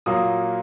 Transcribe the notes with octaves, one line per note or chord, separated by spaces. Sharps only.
A#2 F#3 A#3 D#6